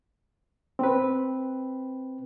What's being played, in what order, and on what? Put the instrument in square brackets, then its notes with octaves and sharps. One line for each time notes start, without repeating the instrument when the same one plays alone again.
[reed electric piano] C4 B4